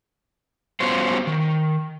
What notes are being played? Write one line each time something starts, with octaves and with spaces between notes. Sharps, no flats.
G3 B3 C#4 F4 F#4 C5
D#3